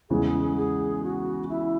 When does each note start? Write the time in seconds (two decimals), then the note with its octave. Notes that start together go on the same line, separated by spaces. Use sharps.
0.10 E2 C#3 E3 G#3 G#4
0.57 G#4
1.03 F#4
1.49 E4